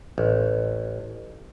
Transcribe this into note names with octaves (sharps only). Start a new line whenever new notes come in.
A1